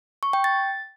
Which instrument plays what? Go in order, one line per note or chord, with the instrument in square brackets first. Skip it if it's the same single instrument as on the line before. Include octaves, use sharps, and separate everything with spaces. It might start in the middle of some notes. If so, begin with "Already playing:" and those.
[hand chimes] C#6
G5
A6